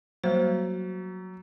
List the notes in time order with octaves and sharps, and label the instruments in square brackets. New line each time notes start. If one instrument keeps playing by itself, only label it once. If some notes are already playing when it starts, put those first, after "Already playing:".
[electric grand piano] F#3 [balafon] G3 A#3 C5